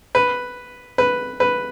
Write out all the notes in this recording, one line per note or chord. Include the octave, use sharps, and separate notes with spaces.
B4
B4
B4